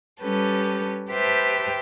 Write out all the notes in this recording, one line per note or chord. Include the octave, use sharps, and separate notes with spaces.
G3 C#4 G4 A4 B4
G4 B4 C5 E5 G5 A5